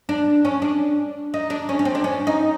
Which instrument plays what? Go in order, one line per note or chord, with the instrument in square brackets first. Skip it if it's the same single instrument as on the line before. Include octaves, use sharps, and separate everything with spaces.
[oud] D4
C#4
D4
D#4
D4
C#4
C#4
C4
D4
C#4
D#4